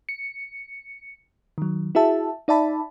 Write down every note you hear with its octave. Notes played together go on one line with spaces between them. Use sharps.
C#7
D#3 F#3
E4 F#4 G#4 E5 A5
D#4 D5 E5 A5 B5